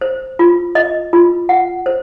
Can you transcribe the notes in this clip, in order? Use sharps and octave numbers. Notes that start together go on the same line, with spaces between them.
C5
F4
D#5
F4
F#5
C5